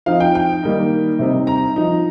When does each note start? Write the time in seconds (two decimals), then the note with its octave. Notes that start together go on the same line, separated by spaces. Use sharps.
0.06 F3 C4 D#4 F5
0.20 G5
0.35 G5
0.63 D#3 G3 A#3 D#4
1.19 C3 G3 C4 D#4
1.47 A#5
1.76 F3 D#4